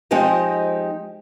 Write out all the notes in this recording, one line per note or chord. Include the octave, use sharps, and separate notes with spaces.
F3 G#3 C4 D#4 G4 D#5